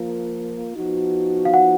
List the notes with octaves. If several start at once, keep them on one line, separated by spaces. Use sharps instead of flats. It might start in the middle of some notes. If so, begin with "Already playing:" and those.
Already playing: F3 A#3 F4 A#4
F3 B3 D#4 F#4
F5
F#5